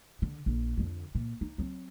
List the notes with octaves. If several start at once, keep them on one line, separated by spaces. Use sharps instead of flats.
D3
A#1
F2 D3
A#2
D#4
F#3 C4